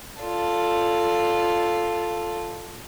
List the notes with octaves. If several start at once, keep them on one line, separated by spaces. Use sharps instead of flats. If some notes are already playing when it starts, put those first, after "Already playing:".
F4 A4 D5 A5